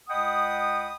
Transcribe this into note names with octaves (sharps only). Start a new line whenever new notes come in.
C#2 D#5 F#5 G5 B5 D#6